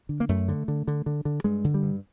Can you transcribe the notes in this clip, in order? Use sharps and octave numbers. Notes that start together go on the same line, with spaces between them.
D3
A#3
F#2 A3
D3
D3
D3
D3
D3
G2 G#3
D3
G3
G2